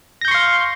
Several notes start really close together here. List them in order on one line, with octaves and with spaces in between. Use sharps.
A#6 G6 C#6 C6 F5